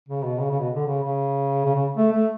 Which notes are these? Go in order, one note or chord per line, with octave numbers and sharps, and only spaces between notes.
C#3
B2
C#3
C#3
B2
D3
C#3
C#3
C#3
C#3
A3
A3